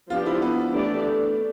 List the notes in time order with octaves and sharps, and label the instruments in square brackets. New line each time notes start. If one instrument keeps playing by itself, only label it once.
[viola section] F3 B3 D4 G4 [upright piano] F4
[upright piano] E4
B3
[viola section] E3 A3 D4 G4 D5
[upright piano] A3